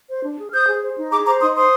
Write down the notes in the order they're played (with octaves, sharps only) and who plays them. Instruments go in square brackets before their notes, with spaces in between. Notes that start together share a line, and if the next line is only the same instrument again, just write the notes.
[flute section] C5
D4
G#4
F6
C5 D#6 G6
G#4
C5
D#4
G#4 A#5 D6
C5 A#5 D6
D#4 C6 D#6
C5 C6 D#6